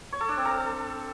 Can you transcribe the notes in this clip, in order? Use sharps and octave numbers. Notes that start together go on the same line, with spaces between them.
C#5
A4
D4
C4
A4